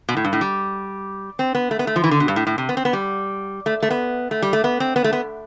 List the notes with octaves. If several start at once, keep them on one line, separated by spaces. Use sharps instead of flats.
B2
A2
G2
A2
G3
C4
B3
A3
B3
A3
F3
E3
D3
B2
G2
A2
A2
C3
B3
C4
B3
G3
A3
A3
B3
A3
G3
A3
B3
C4
B3
A3
B3